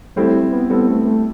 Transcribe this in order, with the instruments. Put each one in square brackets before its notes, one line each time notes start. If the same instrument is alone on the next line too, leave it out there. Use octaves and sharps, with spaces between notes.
[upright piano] G3 C4 E4 A4 C5 [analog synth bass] A3
[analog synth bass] B3
[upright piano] G3 C4 E4 A4 C5 [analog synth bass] B3
[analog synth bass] A3
A3